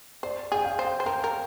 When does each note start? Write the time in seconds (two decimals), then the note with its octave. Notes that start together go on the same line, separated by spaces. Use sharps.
0.23 C5 D5
0.52 G#4 G5
0.65 F5
0.79 C5
0.85 G5
1.00 C5
1.06 A#4 G5
1.24 A#4